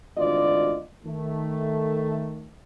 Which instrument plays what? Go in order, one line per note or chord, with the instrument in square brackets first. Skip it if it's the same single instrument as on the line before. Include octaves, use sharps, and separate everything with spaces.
[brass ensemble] G#1 D2 E3 F4 D5 D#5
D#3 A3